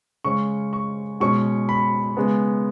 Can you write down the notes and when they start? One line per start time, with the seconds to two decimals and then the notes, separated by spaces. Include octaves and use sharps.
0.24 C#3 G#3 C#4 C#6
0.73 C#6
1.20 B2 G#3 C#4 C#6
1.69 B5
2.17 C#3 G#3 B3